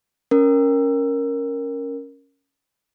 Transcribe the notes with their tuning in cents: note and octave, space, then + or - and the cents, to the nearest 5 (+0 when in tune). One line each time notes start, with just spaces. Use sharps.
C#4 +0 A#4 +0